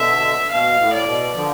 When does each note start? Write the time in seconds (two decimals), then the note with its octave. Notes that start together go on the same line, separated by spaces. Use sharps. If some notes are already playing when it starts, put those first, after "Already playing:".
Already playing: B2 D3 E5
0.51 B2 F5
0.79 A2
0.93 D5
1.07 B2
1.35 D3 F3